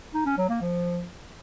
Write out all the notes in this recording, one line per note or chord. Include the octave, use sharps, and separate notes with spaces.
D#4
C#4
F#3
A#3
F3